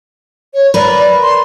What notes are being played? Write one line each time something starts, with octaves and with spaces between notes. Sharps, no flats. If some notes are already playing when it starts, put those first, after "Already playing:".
C#5
A#4 B4 D5
C6